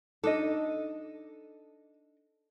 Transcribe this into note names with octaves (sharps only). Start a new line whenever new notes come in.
D4 D#4 A4 D#5